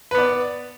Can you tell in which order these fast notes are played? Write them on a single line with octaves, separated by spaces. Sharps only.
B4 B3 D5